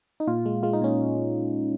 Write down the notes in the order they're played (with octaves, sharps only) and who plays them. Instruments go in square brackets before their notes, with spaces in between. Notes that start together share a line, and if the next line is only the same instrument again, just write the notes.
[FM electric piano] D#4
A#2 F4
G#3
G#3 F4
D#4
A#2 C#4